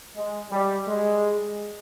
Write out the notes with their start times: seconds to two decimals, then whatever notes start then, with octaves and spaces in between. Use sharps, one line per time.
0.15 G#3
0.51 G3
0.87 G#3